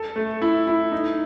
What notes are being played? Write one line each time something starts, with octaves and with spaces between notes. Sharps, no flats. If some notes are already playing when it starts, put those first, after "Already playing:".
Already playing: A4
A3
E4
E4
D#4